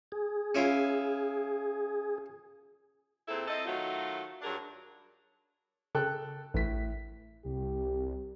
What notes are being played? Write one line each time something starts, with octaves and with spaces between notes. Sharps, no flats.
G#4
C#4 E4 F4
A#2 C4 E4 G#4 A4
C4 E4 A4 D#5
D#3 F#3 A3 F4 F#4
G2 F#3 D4 G#4 A#4
C#3 A4 G5 F#6
A1 A2 B6
C2 G4